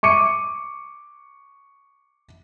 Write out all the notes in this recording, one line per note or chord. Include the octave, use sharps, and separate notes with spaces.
C#6 D6 C#7 D#7